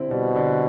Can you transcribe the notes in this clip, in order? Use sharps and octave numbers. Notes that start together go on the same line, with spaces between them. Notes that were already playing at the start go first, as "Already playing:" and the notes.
Already playing: D3 G3 C4 E4
B2 G3
D3